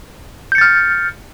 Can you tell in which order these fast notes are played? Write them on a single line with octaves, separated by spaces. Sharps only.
G6 C#7 A6 F6